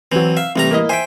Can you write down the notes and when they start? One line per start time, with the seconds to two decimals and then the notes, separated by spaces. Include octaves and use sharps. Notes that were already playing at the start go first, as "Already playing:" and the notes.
0.12 E3 F#3 C4
0.37 E5 F5
0.56 A1 C3 G3 A3 A#5
0.71 A#3 E4 D#5
0.89 C5 E5 G5 G#5